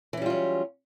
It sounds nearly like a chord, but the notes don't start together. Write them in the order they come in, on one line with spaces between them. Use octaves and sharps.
E3 C#4 G3 F4 F#3